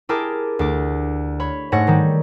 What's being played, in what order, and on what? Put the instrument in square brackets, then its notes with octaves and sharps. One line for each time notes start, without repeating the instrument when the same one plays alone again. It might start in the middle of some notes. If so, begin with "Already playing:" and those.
[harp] E4 G4 G#4 A#4 A5 D6
D2 D6
C#5 B5
G#2 A3 C#5 F#5 A#6
D#3 G3